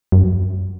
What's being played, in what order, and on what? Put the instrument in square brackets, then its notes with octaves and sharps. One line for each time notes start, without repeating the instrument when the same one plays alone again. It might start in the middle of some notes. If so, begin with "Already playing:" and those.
[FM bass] F#2